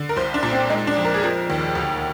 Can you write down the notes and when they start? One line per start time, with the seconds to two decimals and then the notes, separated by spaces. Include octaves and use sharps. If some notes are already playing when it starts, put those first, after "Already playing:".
Already playing: D3
0.09 A#4
0.16 C2 C5
0.34 D4
0.43 A#2
0.52 C4
0.70 G#3 D#4
0.87 D4
0.96 F2
1.05 A#4
1.14 G#4
1.23 F3 A#4
1.50 D#2
1.75 D2